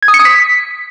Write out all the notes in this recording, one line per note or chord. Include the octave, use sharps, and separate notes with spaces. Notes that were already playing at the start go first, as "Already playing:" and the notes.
G#6
D#6
C#7
D#6
B6